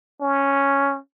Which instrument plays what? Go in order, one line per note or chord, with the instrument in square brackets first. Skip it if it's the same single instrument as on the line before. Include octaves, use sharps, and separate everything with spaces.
[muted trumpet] C#4